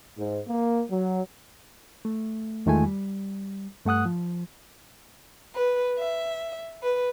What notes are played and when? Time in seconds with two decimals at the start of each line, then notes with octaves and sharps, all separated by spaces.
0.18 G#2
0.48 A#3
0.89 F#3
2.05 A3
2.66 E2 D#3 G#3 A3 F4 G#5
2.86 G3
3.85 G2 A3 F#5 D#6 F#6
4.06 F3
5.54 B4
5.98 E5
6.82 B4